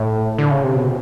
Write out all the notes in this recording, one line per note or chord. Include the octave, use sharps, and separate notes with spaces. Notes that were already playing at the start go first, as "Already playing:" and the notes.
Already playing: A2
D3
C#3
C3
B2